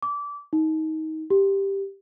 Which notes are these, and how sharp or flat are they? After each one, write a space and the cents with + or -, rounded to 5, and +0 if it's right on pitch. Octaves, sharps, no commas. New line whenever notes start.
D6 -25
D#4 +20
G4 +5